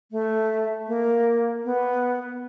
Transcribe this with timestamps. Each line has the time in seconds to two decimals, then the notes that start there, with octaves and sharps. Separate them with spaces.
0.12 A3
0.88 A#3
1.65 B3